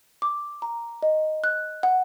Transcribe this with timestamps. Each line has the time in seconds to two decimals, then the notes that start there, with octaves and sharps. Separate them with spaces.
0.22 D6
0.62 A#5
1.03 D#5
1.44 F#6
1.83 F#5